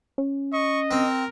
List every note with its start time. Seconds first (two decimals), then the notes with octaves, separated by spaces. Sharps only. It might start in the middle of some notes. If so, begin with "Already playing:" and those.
0.18 C#4
0.53 D#5 C#6
0.91 C4 A#4